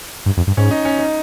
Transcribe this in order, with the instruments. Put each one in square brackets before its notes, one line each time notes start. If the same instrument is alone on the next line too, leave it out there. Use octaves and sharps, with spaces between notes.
[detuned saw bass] G2
F2
G2
[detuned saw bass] G#2 [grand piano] C#4
[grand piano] D#4
C#4
D#4